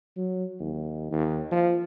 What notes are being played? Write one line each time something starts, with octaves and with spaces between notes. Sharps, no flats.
F#3
D#2
D#2
F3